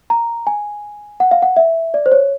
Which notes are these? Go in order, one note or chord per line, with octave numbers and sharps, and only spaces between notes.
A#5
G#5
F#5
F5
F#5
E5
D5
C5
C#5